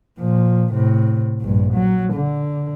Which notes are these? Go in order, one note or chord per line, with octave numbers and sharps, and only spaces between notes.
A#2 F3
A2 C3
A#1 G2
F#3
D3